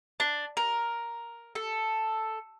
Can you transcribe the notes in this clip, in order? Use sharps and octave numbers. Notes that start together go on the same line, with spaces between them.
D4
A#4
A4